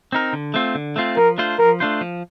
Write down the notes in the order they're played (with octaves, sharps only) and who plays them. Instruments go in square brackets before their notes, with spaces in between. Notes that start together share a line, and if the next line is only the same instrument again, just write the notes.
[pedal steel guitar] C4 D#4 A#4
D3
A3 C4 F4
D3
A3 C4 F4
[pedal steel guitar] F3 [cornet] A#4
[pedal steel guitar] A3 D4 F4 C5
[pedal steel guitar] F3 [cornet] A#4
[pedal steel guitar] A3 D4 F4 C5
F3